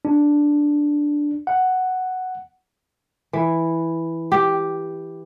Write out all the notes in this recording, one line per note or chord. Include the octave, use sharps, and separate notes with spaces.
D4
F#5
E3
G4